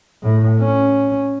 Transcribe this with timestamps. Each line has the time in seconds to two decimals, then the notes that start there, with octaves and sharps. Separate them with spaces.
0.22 A2
0.60 C#4